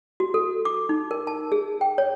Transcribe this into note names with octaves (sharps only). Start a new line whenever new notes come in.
F#4
A4
D6
D#4
A#4
A5
G#4
G5
C#5